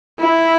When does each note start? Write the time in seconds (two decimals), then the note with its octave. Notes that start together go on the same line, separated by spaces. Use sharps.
0.20 E4